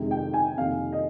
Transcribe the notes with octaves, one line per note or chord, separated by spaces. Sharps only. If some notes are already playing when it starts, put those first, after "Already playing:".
Already playing: F2 C3 D#3 G#3
G5
G#5
F2 C3 D#3 A#3 F5
D#5